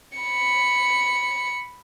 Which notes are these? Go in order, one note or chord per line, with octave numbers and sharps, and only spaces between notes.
B5 C#7